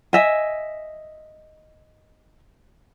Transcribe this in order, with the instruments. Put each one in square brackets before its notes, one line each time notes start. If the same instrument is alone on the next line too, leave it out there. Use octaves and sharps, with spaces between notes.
[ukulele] D#5 E5 G#5